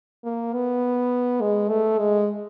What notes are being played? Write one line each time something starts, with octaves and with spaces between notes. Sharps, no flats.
A#3
B3
G#3
A3
G#3